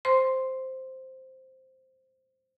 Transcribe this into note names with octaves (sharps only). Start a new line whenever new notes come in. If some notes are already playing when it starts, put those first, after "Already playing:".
C5 C6